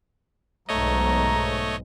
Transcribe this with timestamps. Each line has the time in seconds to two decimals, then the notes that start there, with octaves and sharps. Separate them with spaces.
0.69 B1 G#2 A3 C#5 D#5 A#5